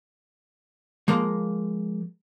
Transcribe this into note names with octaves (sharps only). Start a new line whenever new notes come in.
F3 G#3 A#3